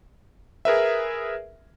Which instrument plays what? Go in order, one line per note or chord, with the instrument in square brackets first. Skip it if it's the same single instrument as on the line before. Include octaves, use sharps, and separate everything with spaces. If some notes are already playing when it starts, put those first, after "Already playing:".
[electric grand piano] G#4 A#4 B4 E5